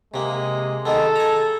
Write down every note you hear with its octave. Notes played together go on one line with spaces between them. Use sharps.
C3 G#3 A#3
D#3 G#3 B3 A4
G#5 A#5